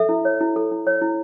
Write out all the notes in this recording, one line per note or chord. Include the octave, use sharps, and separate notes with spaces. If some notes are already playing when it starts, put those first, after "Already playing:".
Already playing: A4 E5
E4
C#5
E4
A4
E4
C#5
E4